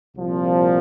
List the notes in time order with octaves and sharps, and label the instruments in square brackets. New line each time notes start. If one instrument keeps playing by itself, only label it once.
[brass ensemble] C2 A#2 F3 C4